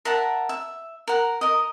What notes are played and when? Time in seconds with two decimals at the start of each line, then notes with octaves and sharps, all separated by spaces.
0.05 A#4 E5 F#5 A5
0.49 E5
1.08 A#4 F#5
1.41 A#4 D#5